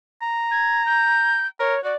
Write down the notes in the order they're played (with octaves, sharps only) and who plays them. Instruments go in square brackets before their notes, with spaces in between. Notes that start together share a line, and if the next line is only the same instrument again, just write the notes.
[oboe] A#5
[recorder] G#6
G6
[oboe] A#4 [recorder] C#5
[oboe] F#4 [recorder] D5